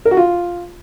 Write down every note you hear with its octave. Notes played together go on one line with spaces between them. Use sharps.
A#4
F#4
F4